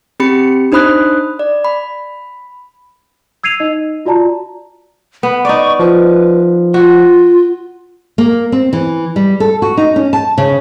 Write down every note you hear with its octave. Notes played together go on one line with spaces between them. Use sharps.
C4 G4 B5 C#7
D4 D#4 C5 B5 D#6 F#6
D5
B5
E6 G#6 C7 D#7 F7
D#4 D#5
F4 F#4 D5 A5 A#5
B3 B5
D#4 D5 C#6
F3 B4
F4 F#4
A#3
C4
E3
G3
A4
F#4
D#4
C#4
A5
C#3